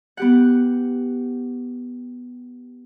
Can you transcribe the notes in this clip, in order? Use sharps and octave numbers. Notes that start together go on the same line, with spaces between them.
B3 G4 F#5